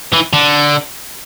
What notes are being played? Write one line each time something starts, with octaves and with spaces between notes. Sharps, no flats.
E3
D3